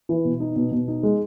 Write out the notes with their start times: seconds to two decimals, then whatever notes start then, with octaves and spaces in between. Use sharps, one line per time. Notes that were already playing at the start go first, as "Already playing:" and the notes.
0.09 E3
0.25 B2
0.40 D#4
0.56 B2
0.72 B2
0.88 D#4
1.03 G#3